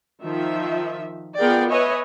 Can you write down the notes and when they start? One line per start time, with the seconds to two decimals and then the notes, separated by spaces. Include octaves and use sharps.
0.24 D#3 F3 E5
1.39 B3 F4 G#4 A#4 D5 G5
1.69 B4 C#5 D#5 E5 G#5